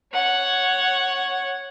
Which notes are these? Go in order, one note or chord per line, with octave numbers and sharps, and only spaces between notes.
C#5 F#5